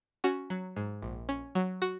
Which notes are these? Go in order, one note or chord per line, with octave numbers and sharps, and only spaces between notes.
C#4 F#4
F#3
G#2
A#1
C#4
F#3
F#4